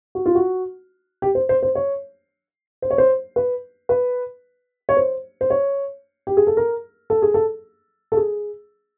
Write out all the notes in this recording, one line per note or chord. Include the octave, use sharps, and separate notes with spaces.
F#4
F4
F#4
G4
C5
C5
C5
C#5
C5
C#5
C5
B4
B4
C#5
C5
C5
C#5
G4
G#4
A4
A#4
A4
G#4
A4
A4
G#4